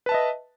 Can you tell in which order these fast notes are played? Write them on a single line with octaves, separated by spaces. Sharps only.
B4 A5 E5 D#5